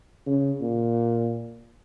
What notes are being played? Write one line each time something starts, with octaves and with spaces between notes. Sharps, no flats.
C#3
A#2